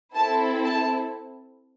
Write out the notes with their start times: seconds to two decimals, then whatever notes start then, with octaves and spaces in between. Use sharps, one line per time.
0.15 C4 E4 A4 A5
0.64 A5